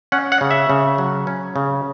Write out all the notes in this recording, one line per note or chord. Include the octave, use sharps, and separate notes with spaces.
C#4 F#5
F#5
C#3
E5
C#3
F#3
C#4
C#3